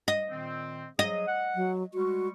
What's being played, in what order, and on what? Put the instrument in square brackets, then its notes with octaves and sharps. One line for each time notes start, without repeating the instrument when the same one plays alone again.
[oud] D#5
[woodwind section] A#2 D#3 C4
[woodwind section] F#3 G#4 D#6 [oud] D#5
[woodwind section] F#5
[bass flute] F#3
[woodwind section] G3 G#3 C#6 [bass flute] F#4